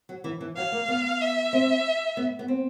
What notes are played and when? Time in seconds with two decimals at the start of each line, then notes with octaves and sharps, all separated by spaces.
0.09 F#3
0.24 E3
0.41 E3
0.56 F#3 F5
0.72 A#3
0.88 B3
1.21 E5
1.53 C4
2.17 B3
2.39 B3
2.48 C4